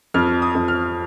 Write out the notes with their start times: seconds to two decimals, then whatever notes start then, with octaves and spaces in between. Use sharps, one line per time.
0.14 F2 F6
0.42 D#6
0.55 F2
0.68 F6